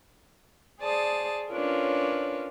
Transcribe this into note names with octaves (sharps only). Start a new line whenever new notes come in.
G#4 C5 D5 A5 D#6
C#4 D4 F4 A#4 B4 C#5